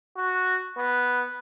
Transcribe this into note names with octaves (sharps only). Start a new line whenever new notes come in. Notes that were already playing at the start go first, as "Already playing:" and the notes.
F#4
B3